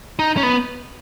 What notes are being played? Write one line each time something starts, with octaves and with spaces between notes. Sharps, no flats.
D#4
C#4
B3